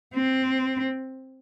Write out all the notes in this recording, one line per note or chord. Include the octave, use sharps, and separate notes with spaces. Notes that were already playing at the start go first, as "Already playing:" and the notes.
C4